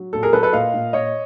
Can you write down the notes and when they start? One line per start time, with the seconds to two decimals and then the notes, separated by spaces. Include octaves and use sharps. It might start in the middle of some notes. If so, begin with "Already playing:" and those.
Already playing: F#3
0.13 A#2 A4
0.23 G#4 A#4
0.33 F#3 A4 B4
0.43 A4 B4
0.53 A#2 D#5 F5
0.74 A#2
0.93 A#2 C#5 D#5